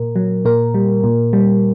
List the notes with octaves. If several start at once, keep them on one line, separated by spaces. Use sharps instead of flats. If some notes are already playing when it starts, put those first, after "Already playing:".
Already playing: A#2 A#4
F#3
A#2 A#4
G3
A#2
G3